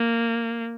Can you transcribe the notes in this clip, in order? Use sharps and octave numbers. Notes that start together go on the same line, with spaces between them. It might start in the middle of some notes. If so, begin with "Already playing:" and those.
Already playing: A#3